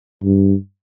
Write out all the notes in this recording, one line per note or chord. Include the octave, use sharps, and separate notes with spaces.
G2